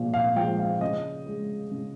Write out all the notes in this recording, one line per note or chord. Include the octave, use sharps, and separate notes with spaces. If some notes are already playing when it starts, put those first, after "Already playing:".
Already playing: A#2 F3 G#3 F5
F5
F3 G#3 G5
F5
C#3 D#5
G#3
C#3